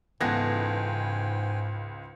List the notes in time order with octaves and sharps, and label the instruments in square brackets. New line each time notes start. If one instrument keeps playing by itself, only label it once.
[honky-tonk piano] C#2 A#6 [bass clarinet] G#2 [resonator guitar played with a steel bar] E3 B3 A4 [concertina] G5 G#5